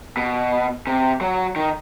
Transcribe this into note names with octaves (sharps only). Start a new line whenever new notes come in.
B2
C3
F#3
D#3